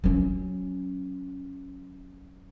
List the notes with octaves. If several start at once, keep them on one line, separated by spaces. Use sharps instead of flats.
F#3 C#4